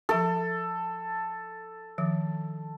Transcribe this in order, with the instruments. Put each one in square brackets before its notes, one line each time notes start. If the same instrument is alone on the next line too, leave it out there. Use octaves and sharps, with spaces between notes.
[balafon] F3 E5 C#6 [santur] A4
[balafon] D#3 F3